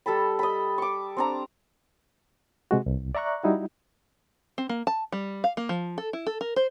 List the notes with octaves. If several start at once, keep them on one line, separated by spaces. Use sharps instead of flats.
G3 A4 A5 B5
D#5 B5
C#6 D6
C4 D4 A#5
C3 G#3 F#4
C2
D5 E5 A#5 C#6 F#6
G3 D#4 E4 F#4
C4
A#3
A5
G3
F5
A#3
F3
A4
E4
A4
A#4
C5